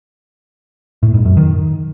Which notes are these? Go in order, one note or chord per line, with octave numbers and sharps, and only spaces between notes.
A2
G#2
F#2
D#3